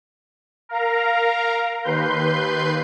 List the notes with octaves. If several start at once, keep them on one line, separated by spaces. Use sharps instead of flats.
A#4 F5 A#5
D#2 B4 C6 G6